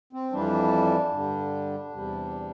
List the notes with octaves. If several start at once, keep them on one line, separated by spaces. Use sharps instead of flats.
C4
F2 E3 G3 D4
G2 D3 G3
E2 C3 G3